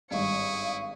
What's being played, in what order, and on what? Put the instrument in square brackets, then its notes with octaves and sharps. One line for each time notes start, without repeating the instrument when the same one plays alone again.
[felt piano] G#1 G2 [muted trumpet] E4 [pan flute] F5 [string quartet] C#6 D#6